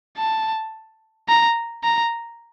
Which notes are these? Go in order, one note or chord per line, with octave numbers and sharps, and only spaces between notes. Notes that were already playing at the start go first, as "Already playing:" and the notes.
A5
A#5
A#5